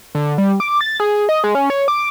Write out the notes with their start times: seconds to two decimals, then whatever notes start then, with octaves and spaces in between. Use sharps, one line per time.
0.15 D3
0.38 G3
0.60 D6
0.81 A6
1.00 G#4
1.29 D#5
1.44 G#3
1.55 C#4
1.70 C#5
1.88 D6